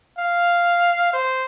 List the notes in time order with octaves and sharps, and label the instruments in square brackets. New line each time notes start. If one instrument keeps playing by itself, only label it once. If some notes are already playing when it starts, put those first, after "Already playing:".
[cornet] F5
C5